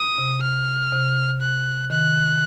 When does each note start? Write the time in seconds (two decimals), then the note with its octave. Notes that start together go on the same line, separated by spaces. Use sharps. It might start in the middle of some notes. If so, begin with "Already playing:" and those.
Already playing: D#6
0.18 C3
0.43 F6
0.92 C3
1.41 F#6
1.90 D#3 F#6